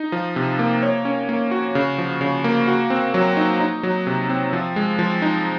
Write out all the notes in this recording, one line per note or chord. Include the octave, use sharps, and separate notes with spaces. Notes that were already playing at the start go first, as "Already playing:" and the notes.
Already playing: D#4
F3
C3
A#3
C#5
C#4
A#3
F#4
C#3
F3
C#3
A#3
F#4
C4
F#3
D#4
D#4
F#3
C3
C4
F3
G#3
F3
D#4